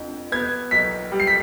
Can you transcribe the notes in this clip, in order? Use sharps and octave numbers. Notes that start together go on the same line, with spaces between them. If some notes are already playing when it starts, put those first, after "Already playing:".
Already playing: F1 F2 D3
B3 G#6
B1 B6
G3
C7
B6